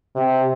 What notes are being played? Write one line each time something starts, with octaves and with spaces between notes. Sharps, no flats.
C3